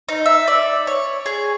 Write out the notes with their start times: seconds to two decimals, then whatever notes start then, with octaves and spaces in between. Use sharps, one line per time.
0.09 D#4
0.26 E5
0.48 D5
0.87 C#5
1.26 G#4